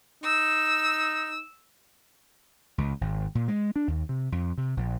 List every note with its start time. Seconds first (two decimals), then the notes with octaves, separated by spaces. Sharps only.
0.24 D#4 E6
2.78 C#2
3.01 G#1
3.35 A#2
3.48 G#3
3.76 D4
3.88 D#2
4.09 C3
4.32 F2
4.58 C3
4.77 A#1